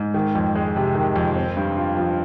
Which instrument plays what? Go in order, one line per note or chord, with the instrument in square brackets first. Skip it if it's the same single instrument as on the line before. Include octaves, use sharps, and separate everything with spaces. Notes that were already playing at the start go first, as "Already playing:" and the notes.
Already playing: [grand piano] G#2
D#3
F2
G#3
C3
D#3
F2
C4
G2
F4
F3